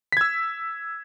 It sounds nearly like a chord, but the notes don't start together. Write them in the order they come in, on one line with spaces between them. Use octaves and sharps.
B6 G#6 E6